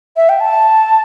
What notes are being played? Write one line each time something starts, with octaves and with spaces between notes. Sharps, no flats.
E5
G5
A5